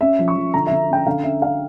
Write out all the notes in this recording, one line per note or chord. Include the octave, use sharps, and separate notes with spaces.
C#4 E5
F3
C#6
F3
D3 A#5
E5
D3
C#4 G5
D3 F5
C#4 E5
C#4 F5